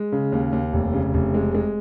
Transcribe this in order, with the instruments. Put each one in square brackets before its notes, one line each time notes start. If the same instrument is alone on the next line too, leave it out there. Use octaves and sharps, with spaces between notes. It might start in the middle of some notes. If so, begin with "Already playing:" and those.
Already playing: [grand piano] G#3
C#3
D#2
D#2
F1
C#3
F1
G#3
G#3